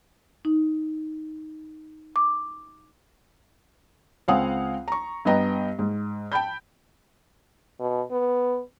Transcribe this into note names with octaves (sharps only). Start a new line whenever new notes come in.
D#4
D6
C#2 C4 F5 F#5 G#5 D#6
A#5 C#6
G2 B3 B4 D#5 G5 A#5
G#2
G5 A5 B5 G6
B2
B3